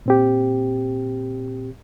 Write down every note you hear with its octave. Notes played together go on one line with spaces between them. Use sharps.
A#2 C4 G4